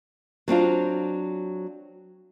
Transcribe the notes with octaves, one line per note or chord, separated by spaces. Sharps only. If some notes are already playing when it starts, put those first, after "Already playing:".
F#3 C4 D4 F4